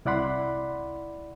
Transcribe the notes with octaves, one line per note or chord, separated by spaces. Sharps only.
C2 E4 D5 F#5 B5 C6